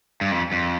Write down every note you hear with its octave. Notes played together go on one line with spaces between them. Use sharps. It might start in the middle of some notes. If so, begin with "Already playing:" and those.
G2
F2
F2